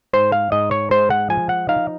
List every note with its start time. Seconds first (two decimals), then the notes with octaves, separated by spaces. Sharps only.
0.13 G#2 C5
0.32 F5
0.52 G#2 D#5
0.71 C#5
0.91 G#3 C5
1.10 F#5
1.30 F3 G#5
1.49 F#5
1.69 D#4 F5